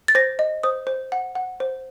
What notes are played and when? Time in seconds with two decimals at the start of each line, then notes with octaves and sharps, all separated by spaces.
0.08 A6
0.15 C5 A#6
0.39 D#5
0.63 C5 D#6
0.87 C5
1.12 F#5
1.35 F#5
1.60 C5